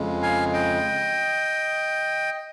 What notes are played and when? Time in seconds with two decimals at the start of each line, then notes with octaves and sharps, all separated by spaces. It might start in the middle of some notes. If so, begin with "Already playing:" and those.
Already playing: F2 C#3 G#3
0.22 F5 G#5
0.53 D#5 G5